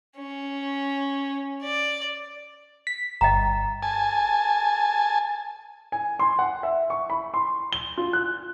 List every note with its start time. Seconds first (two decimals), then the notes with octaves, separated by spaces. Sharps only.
0.17 C#4
1.62 D5
2.87 B6
3.21 G1 D#5 G5 A#5
3.82 G#5 A5
5.92 G#5
6.19 C6
6.39 F#5
6.63 E5
6.90 C#6
7.10 B5
7.34 C6
7.73 G7
7.97 F4
8.13 F#6